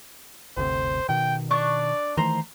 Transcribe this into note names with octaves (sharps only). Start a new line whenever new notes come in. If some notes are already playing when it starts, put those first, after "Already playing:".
G1 D2 C3 C5
B2 D#3 G5
D4 D5 C#6 F#6
D#3 E3 A3 C5 A#5